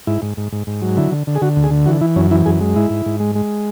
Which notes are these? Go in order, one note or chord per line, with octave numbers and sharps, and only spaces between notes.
G#2 E4
G#2
G#2
G#2
G#2
F#3
D3 E4
D3
D3
G#4
D3 F#4
D2
G#4
D3
E3 F#4
E3 E4
F#2 C#4
E3 E4
F#2 G#4
G#3
G#2 E4
G#2
G#2
G#3
G#3